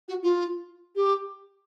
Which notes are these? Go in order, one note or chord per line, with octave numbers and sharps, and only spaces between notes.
F#4
F4
G4